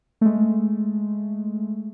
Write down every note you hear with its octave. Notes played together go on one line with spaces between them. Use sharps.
G#3 A3